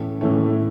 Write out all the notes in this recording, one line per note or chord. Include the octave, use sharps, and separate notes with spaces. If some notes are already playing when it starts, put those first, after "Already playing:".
Already playing: A2 E3 A3 C#4
A2 E3 A3 C#4